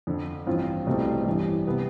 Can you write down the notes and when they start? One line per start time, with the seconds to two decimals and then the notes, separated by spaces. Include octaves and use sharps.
0.07 F2 D3 F3
0.47 A1 G2 F3 C4 F4
0.87 C2 B2 A3 C4 G4
1.26 A1 G2 E3 G3
1.66 C3 G3 B3 E4